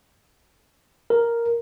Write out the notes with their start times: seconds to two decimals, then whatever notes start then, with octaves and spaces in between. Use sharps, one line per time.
1.10 A#4